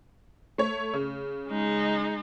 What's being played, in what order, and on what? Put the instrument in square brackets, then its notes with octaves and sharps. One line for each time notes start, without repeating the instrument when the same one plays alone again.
[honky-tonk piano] A3 C#5
C#3
[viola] G#3 D#4